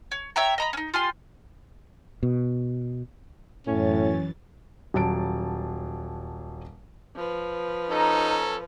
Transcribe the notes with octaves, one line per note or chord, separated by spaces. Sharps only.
C#5
C#5 E5 G5 A#5
D#5 A#5 B5
C#4 D#4
F4 G4 G#5 C6
B2
F#2 A2 E3 C#4 A6
D#1 F#3 A5 D7
F3 B4
C#4 D#4 A4 A#5